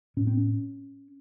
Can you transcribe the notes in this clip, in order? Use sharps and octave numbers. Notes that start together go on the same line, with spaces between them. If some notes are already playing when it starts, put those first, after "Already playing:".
A2 C#4
C4
C#4